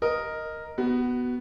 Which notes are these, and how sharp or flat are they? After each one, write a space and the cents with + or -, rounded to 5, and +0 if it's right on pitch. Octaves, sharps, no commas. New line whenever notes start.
A#4 +0 D#5 +0
B3 +0 F#4 +20